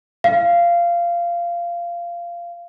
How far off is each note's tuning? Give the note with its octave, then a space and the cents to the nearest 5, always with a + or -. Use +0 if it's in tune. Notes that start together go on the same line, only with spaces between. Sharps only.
F5 -15